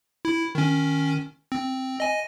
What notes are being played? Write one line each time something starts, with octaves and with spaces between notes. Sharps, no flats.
E4
D#3 C#4
C4
D#5 G#5